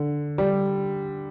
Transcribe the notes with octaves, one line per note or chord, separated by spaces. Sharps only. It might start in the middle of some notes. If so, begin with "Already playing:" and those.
Already playing: D3
G3